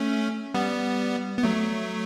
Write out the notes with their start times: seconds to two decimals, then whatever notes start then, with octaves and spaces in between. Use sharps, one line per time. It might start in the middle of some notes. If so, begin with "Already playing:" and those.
Already playing: A3 C#4
0.55 G3 B3
1.38 B3
1.43 F#3 A3